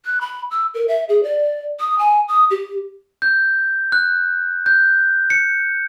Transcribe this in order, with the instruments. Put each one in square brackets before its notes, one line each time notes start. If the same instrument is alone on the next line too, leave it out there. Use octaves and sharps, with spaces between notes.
[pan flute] F#6
B5
E6
A#4
E5
G#4
D5
D#6
G#5
D#6
G4
[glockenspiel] G6
F#6
G6
C#7